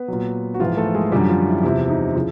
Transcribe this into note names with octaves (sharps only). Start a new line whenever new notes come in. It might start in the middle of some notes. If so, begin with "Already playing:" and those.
Already playing: B3 B4
A#2 F#3
F#4
G#2 E3 F3 F4
A3 A4
G#3 G#4
F#2 D3 F3 G3 G4
F3 F4
E4
E2 C3 F3 E4
D#4
C#3 F3 E4